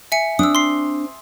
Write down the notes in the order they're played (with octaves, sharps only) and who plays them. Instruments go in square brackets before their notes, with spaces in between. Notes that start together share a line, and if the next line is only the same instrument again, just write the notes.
[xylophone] E5 G#5 C#7
[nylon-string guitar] C4 D4 [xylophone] D#6 E6
[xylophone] C6 C7